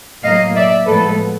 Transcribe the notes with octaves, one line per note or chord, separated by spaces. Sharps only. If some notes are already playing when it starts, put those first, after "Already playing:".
A2 F#3 A#3 D#5 F5
D5 E5
A2 F3 G#3 B3 A4 B4